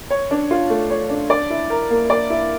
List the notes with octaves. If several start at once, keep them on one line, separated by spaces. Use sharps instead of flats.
C#5
D4
F4
A3
C#5
D4
D5
E4
A#4
A#3
D5
E4